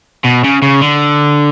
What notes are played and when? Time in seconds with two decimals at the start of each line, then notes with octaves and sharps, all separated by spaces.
0.25 B2
0.44 C#3
0.62 C#3
0.81 D3